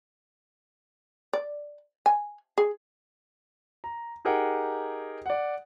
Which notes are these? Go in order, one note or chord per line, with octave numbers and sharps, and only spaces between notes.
D5
G#5
G#4
A#5
D#4 G4 G#4 A#4 F#5 G5
D5 F#5